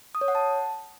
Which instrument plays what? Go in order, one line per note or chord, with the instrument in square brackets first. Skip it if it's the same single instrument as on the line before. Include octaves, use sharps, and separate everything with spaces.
[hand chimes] D#6
C#5
F#5
A5